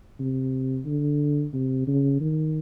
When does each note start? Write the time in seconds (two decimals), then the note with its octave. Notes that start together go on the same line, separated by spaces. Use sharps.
0.20 C3
0.86 D3
1.53 C3
1.87 C#3
2.21 D#3